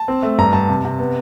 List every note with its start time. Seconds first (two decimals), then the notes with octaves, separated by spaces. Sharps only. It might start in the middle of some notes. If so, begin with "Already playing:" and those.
Already playing: A5
0.08 C4
0.23 A3
0.38 G2 A#5
0.53 G2 A5
0.69 C3
0.84 C3
0.99 B3